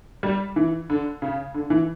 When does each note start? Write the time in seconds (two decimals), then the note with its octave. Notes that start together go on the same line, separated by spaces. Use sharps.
0.23 G3
0.56 E3
0.90 D3
1.22 C#3
1.54 D3
1.70 E3